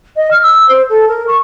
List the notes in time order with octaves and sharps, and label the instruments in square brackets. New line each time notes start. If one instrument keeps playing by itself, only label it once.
[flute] D#5
F6
E6
C5
A4
A#4
C#6